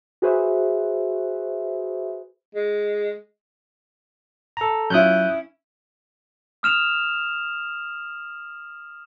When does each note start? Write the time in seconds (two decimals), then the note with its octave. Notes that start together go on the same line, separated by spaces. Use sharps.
0.22 F#4 G#4 B4 C5 E5
2.55 G#3
4.57 A4 A#5
4.90 F#3 C#4 E4 F4 D#6 F#6 G6
6.63 D#6 F6 E7 F7